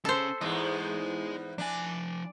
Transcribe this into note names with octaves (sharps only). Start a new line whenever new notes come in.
C#4 G#4 A4 C5
E2 G#2 B3 G#4 D#5
F3 D4 G#5